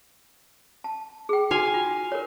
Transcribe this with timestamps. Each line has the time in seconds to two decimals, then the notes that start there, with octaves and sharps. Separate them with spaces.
0.84 A5
1.29 G#4 G5
1.51 D#4 F#4 F5 G#5
1.74 F4
2.12 A#4 C#5